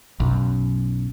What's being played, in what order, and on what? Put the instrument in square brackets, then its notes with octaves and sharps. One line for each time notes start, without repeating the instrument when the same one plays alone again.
[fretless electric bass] B1 F#2